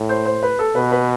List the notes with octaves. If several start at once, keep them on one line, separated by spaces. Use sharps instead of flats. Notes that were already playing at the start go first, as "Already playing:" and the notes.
Already playing: A2
C5
C5
B4
A4
B2 B4
B4